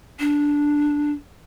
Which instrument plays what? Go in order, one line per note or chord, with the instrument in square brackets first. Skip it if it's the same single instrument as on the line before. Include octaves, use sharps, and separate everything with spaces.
[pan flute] D4